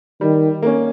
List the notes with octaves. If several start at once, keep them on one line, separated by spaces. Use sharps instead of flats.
D#3 G3
A#3 C#4